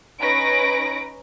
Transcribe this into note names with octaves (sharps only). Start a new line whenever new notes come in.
C#4 D#4 B4 A#6 D7